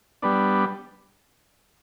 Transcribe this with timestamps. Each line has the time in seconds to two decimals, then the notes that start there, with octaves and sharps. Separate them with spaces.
0.22 G3 B3 D4